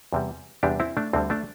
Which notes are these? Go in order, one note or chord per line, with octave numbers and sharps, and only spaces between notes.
E2 C3 G3
E2 C3 G3 D4 G4
C4 E4
A3 D4
D2 D3 G3 C4
A3 D4